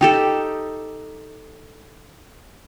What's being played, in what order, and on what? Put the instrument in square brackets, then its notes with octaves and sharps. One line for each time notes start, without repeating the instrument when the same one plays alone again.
[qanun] D#4 G4 A4 [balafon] G5